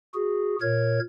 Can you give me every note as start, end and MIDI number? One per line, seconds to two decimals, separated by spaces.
0.14 0.56 66
0.14 0.56 68
0.61 1.00 46
0.61 1.00 70
0.61 1.00 73
0.61 1.00 92